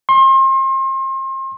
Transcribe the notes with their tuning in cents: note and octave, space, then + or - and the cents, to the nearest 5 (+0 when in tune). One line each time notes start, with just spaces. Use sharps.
C6 +35